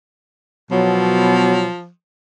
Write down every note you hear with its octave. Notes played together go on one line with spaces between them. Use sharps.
B2 F3 F#3